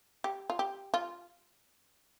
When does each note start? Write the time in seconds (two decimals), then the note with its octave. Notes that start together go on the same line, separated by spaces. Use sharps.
0.24 G4
0.50 F4
0.59 G4
0.94 F4